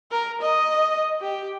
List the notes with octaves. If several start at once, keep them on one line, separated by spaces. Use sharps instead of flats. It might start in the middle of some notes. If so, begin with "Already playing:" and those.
A#4
D#5
G4